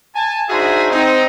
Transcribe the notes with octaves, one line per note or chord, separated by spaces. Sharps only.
G#5 A5
D4 D#4 F#4 G#4 C5 E5
C4 D#4